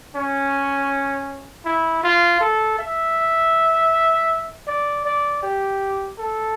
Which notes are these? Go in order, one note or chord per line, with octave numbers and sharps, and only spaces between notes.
C#4
E4
F4
A4
E5
D5
D5
G4
A4